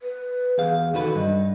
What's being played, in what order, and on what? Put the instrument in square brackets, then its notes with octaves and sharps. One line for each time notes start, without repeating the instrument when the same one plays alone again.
[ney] B4
[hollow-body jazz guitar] E2 F5 [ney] G#4
[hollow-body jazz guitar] D#3 F#4 B4 [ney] A4
[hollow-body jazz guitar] G2 [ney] D#5